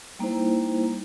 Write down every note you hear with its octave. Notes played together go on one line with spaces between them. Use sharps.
G3 A#3 D#4 E4 C5